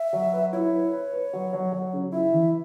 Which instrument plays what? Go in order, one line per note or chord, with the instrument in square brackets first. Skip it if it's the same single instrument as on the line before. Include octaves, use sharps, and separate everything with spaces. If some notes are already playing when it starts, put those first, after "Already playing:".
Already playing: [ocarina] E5
[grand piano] F#3
B4
[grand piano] E4 [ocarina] C#5
[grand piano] B4
B4
B4
F#3
F#3
F#3
C#3
[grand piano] E4 [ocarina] E5
[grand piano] E3